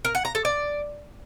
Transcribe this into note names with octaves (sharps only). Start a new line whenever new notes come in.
A#4
F#5
A#5
A4
D5